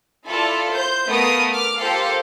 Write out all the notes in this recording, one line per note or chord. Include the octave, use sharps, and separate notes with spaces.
E4 F4 A4 D5
C5 G6
A3 B3 A#4 B4 F5 D#6
D6 F6
F4 G4 A4 A#4 C5 F5